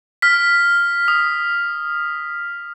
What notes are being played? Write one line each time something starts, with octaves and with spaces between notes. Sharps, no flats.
F6 B6
D#6